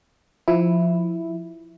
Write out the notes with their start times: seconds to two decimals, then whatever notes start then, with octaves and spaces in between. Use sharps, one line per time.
0.48 F3 E4